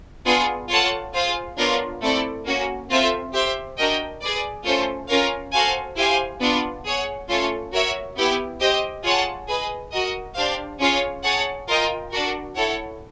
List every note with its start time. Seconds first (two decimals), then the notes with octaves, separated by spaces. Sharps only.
0.26 B3 D4 F4 G#4
0.70 F4 A4 C#5 F#5 A5
1.13 F4 G#4 C5 F5
1.57 B3 D4 F4 A#4 C#5
2.01 A3 C4 E4 A4 D5
2.45 A#3 C#4 F#4
2.89 C4 F4 A4 C5 E5
3.33 G4 C5 E5
3.77 D4 F#4 A#4 D#5 G5
4.21 G#4 B4 D5
4.65 A3 C#4 F4 A4 C5
5.09 C#4 F4 A#4 C#5 F5
5.53 F#4 A4 C5 F5 G#5
5.96 E4 G4 C5 F5 G#5
6.40 B3 D4 F4
6.85 G#4 C#5 F#5
7.28 A3 C#4 F4 A4 C#5
7.73 F#4 A#4 C#5 E5
8.17 B3 E4 G4
8.60 G4 C5 D#5 G5
9.04 F4 G#4 C#5 F#5 A5
9.48 G#4 B4 D#5
9.92 F#4 A#4 D#5
10.35 D4 G4 C5 F5
10.79 C#4 F4 G#4 C#5 F5
11.24 G#4 C#5 F#5 A5
11.68 F4 A#4 D#5 G5
12.12 D4 F#4 A#4
12.56 E4 A4 C#5 F#5